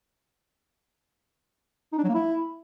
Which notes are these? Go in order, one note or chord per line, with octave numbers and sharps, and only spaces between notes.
D#4
D4
F#3
A#3
E4